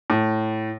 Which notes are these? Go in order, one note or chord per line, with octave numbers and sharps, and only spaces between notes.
A2